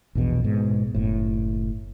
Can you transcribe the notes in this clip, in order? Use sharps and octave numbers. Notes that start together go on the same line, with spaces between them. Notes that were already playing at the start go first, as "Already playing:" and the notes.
A#1 E2 B2
G#2 B2
F#1 A2